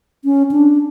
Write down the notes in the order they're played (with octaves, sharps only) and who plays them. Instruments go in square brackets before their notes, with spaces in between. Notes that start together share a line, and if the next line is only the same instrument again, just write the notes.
[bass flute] C#4
D4